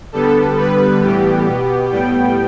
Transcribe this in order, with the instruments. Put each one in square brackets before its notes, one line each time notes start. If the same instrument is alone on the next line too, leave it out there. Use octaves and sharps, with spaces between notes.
[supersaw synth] D3 G3 B3 A4
D3 G3 B3 B4
A2 E3 G3 B3 G4
B2 B3
A2 G3 B3 G5